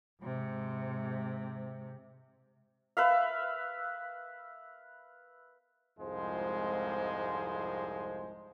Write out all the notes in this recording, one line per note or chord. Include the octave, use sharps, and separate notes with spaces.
G#2 C3
B4 E5 F5
C2 F2 G#2 F3 G#3 C5